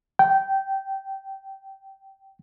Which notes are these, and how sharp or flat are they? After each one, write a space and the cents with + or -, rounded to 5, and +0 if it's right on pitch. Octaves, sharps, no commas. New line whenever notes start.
G5 -15